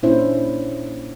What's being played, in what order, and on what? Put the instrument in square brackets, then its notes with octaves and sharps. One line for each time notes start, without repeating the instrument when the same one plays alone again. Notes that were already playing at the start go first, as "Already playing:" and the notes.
[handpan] A#2 C#4 D4 E4 C5